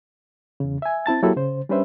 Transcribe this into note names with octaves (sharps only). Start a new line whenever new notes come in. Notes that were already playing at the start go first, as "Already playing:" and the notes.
E2 C#3
E5 G#5
C4 E4 A5 A6
F#3 A#3 E4 F#4 G4 A4
C#3 C5
G3 C#4 D4 B4 C5 E5